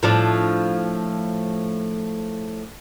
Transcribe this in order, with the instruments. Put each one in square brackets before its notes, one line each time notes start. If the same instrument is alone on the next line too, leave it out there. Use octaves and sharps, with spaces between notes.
[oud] A2 F3 D4